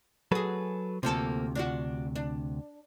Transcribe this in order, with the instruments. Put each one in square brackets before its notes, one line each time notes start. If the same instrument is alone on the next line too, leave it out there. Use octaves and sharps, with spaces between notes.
[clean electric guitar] F#3 A4 B4 [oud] F#4 G#4
[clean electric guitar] D2 C3 [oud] F3 A#3 A4
[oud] D4 F4 F#4
D4